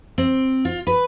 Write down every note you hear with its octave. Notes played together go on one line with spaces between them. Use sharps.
C4
F4
B4